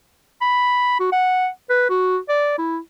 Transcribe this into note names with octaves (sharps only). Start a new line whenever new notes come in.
B5
F#4
F#5
B4
F#4
D5
E4